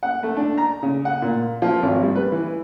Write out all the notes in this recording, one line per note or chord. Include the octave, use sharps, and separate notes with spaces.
F#5
A3
D4
A#5
C#3
F#5
A#2
F3
G#1
G3
B4
E3